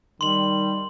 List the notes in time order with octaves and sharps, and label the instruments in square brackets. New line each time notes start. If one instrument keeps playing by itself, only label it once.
[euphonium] D#3 [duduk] G3 [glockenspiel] C6 F#7